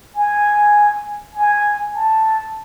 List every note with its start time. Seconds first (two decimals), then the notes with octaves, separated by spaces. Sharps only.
0.15 G#5
1.35 G#5
1.95 A5